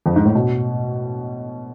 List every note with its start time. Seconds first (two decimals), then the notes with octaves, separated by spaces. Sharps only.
0.06 F2
0.16 G#2
0.26 A2
0.35 B2